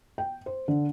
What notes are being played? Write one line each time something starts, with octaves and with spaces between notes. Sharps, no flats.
G5
C5
D3